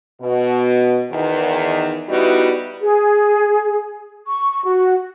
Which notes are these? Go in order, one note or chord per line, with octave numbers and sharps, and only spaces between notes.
B2
E2 D#3
G3 B3 D#4 E4 F#4
G#4
C#6
F#4